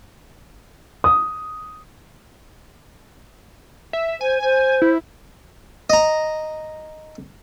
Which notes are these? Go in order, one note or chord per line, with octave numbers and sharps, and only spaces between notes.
D#6
E5
C5 G#5
C5 G#5
E4
D#5 A#5